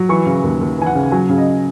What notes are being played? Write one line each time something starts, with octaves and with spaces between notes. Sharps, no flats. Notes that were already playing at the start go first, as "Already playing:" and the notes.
Already playing: F#3
E3 C#6
C#3
D#2
D#2
E3 G#5
F#5
C#3
F#3 G#5
C#3
D#5